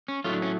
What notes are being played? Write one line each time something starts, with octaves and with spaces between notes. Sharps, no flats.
C#4
A2 F#3 A3 F4
D4
C#4